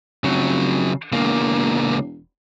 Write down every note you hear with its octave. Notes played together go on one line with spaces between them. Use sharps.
F1 C#3 F#3
E1 C#2 A#3